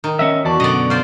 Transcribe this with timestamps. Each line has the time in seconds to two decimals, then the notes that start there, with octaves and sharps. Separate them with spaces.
0.04 D#3
0.19 C#4 D#5 E5
0.45 E2 F#4 D5 A5
0.60 F#2 B2 D3 D5 D#5
0.90 F4 C5 D5